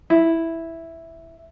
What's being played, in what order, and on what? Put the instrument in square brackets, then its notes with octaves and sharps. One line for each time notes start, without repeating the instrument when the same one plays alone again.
[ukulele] E4